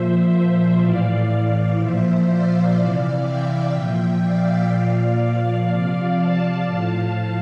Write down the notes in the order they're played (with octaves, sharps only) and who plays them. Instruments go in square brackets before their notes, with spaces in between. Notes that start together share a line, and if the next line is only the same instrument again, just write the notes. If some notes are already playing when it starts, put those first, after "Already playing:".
Already playing: [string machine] A#2 F3 C5 E5
C5 E5
A2 E3 D5 F5
A#2 F3 C5 E5
D5 F5
C3 E3
E5 G5
A#2 F3 E5 G5
D5 F5
A#2 F3 D5 F5
D5 F5
C3 F3
F5 A5
A2 F3 F5 A5